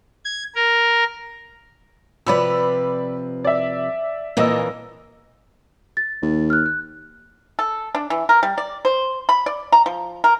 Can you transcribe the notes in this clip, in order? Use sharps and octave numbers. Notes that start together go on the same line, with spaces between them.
G#6
A#4
C3 F3 B4 D5 B5 E6
D5 E5
F2 A#2 E3 A#3 D#5 E6
A6
D#2
F6 F#6
F#6
A4
D4
E3
A#4
G3
D5
C5
B5
D5
A#5
F3
A#4